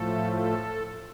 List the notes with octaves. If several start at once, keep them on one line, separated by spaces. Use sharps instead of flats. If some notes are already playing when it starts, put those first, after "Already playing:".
Already playing: A2 F3 A3 A4
A4